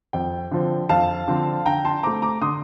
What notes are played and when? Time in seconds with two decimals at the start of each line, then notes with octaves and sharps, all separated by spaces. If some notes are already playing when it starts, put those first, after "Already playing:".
0.13 F2 G5
0.51 D3 F3 C4
0.89 F2 F5 A5
1.28 D3 F3 C4
1.66 D3 G5 A#5
1.85 A5 C6
2.03 A3 C4 A#5 D6
2.22 A#5 D6
2.41 D3 C6 D#6